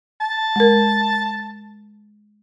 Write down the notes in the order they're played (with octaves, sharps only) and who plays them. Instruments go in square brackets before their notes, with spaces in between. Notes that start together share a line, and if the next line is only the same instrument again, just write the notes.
[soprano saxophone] A5
[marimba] G#3 A#4